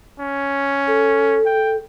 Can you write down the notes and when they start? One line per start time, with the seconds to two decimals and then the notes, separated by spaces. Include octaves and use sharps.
0.20 C#4
0.87 A4
1.46 G5